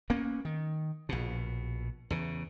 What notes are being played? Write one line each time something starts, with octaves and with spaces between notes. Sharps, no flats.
A#3 B3 C#4
D#3
A#1 B2
E2 C#3